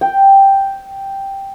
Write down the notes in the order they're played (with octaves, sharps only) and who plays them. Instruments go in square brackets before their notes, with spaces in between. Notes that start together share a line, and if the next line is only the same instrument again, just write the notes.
[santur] G5